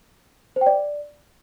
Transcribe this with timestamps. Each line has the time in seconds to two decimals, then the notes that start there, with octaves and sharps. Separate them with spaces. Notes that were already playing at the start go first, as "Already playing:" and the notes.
0.56 C5
0.61 G5
0.66 D5